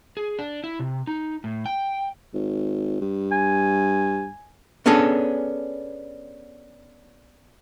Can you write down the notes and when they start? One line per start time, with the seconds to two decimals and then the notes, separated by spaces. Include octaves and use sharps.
0.17 G#4
0.39 D4
0.64 E4
0.80 C3
1.07 D#4
1.44 A2
1.66 G5
2.34 G#1
3.01 G2
3.32 G#5
4.86 B3 C#4 D4 G#4 A4